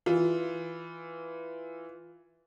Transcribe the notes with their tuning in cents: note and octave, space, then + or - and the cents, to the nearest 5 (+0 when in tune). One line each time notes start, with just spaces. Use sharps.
E3 +0 F4 +0